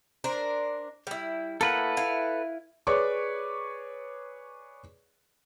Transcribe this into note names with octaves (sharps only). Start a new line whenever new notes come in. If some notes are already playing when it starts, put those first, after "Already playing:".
D4 A#4 C5
G3 E4
A#3 E4 A4 B4 F#5
E4 F5
G#4 B4 C#5 D5 C#6 D6